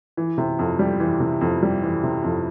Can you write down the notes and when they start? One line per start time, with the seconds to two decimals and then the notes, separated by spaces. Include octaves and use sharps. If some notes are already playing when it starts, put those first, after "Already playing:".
0.17 E3
0.38 C3
0.59 F2
0.79 G3
1.00 E3
1.20 C3
1.41 F2
1.63 G3
1.83 E3
2.03 C3
2.24 F2